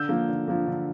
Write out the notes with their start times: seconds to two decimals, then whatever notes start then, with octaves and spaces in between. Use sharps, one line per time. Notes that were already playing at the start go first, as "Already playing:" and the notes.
Already playing: D3 E6 G6
0.09 F3 A#3
0.28 D3
0.48 F3 A#3
0.67 D3